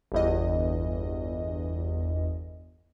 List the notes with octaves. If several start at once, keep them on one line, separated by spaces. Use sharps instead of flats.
G1 E2 D#5